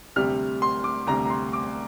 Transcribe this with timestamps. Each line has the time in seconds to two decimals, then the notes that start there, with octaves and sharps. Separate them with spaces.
0.16 D2 C3 G3 F6
0.62 C6
0.84 D6
1.07 D2 C3 G3 A#5
1.25 A#5
1.30 C6
1.53 D6